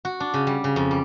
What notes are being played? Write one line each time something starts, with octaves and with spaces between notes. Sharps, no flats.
F#4
D4
C#3
G3
C#3
F2
G3